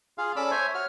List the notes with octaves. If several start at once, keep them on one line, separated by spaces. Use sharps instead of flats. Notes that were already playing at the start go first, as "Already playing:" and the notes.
F4 G#4 F5
C#4 A4 D5 B5 D6 E6
C5 C#5 E5 G#5
F#4 C#5 F6